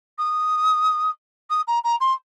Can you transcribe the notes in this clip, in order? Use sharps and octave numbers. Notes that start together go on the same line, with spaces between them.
D#6
D#6
A#5
A#5
C6